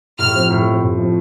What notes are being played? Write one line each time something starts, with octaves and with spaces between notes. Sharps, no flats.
A2 F6
F3 C4
A2
F3 C4
A2
F3 C4